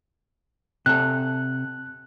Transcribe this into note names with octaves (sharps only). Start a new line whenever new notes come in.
C3 A4 F#6